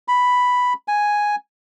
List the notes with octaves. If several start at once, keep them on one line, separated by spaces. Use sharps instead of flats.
B5
G#5